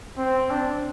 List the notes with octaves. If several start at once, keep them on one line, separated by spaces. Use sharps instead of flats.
C4
D4